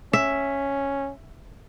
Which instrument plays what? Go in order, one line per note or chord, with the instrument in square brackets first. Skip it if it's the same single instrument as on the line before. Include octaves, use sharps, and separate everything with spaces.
[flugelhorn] C#4 [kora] E5